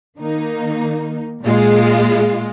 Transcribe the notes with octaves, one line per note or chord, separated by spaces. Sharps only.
D#3 A#3 D#4
A#2 G#3 F4